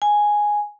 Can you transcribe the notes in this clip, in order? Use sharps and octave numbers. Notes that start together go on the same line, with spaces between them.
G#5